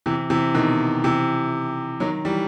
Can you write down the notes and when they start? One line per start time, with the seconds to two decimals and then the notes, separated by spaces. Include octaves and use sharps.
0.06 C3 E3
0.30 C3 E3
0.54 B2 D#3
1.04 C3 E3
2.00 D#3 F#3
2.25 E3 G3